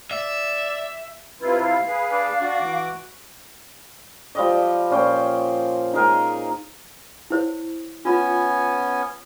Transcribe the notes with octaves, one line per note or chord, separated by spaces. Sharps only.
D5 E5
C3 E4 F4 B4
F5
G#4 B4
D4
D4 F#4 D5
E3 D6
F3 G3 D#5
A#2 C#4 C5 G5
D#4 G#4 A#4 G#5
E4 C5 C#5
B3 C#4 F4 G#5 B5